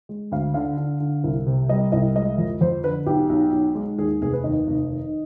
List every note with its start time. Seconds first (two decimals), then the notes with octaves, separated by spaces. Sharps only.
0.09 G#3
0.32 D2 F5
0.54 D3 F5
0.78 D3
1.00 D3
1.24 C2
1.47 C3
1.69 G3 D#5
1.92 C2 D#5
2.16 G#3 D#5
2.38 F2
2.61 F2 C5
2.84 D3 B4
3.06 B1 G4
3.29 B1
3.52 B1
3.75 G#3
3.98 D#2 G#4
4.21 F1 G#4
4.33 B4
4.44 D#2 D#5
4.67 F1
4.89 D#3